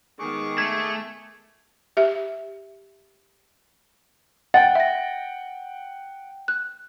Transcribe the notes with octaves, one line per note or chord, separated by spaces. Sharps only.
D#3 G#3 B3 G#4 C#6 D6
A3 G#6
G4 E5
F#5 G5 A6
E5 A#6
F#6